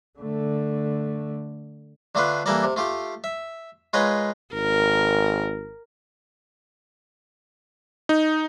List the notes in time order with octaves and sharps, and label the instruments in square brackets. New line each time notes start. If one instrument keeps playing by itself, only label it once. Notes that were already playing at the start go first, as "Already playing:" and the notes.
[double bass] D3 A3
[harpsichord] D3 A3 D4 F4 B4
E3 G3 A#3 A4 A#4 D5
C3
A3 F4 G4
E5
G#3 F4 A#4 B4 C#5 D#5
[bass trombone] G#1 [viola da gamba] A#4
[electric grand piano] D#4